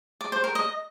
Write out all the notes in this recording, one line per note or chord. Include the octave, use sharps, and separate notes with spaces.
D5
C5
A#4
D#5